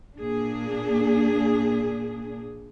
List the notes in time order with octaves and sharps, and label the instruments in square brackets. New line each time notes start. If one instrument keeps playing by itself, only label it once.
[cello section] A#2 A#3 D4 G#4